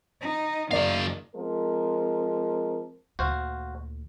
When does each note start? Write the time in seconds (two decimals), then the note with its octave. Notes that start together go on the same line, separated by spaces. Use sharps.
0.21 D#4
0.71 F#1 D#3 F#3 D5 F5
1.35 F3 G#3 C4 A#4
3.19 D2 A#2 F#4 C5 F5